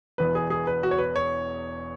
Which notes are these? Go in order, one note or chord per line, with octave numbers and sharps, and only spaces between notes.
E1 E2 E3 B3 B4
G#4
G#4
B4
F#4
C#5
B4
C#5